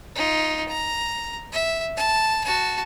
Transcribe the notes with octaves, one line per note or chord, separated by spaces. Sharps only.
D#4 F4
A#5
E5
A5
F#4 A5